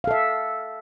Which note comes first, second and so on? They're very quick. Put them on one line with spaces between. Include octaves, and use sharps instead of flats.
F5 A4 E5